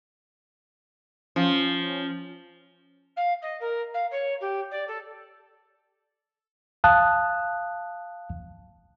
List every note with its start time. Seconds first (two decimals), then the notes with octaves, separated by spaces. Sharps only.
1.36 F3 C#4
3.16 F5
3.42 D#5
3.60 A#4
3.94 F5
4.11 C#5
4.40 G4
4.71 D5
4.87 A4
6.84 F5 A5 D#6 F#6